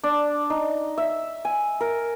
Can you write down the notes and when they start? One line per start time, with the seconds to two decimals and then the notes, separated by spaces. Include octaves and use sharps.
0.03 D4
0.50 D#4
0.98 E5
1.45 G#5
1.80 A#4